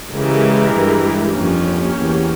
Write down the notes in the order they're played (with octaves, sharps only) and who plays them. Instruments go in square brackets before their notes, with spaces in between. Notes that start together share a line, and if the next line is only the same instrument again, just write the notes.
[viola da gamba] C#3 [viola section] E3 G#3 E4 G4 A#4
[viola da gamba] G2
[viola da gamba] F2 [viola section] A#3 C#4 G4
[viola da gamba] E2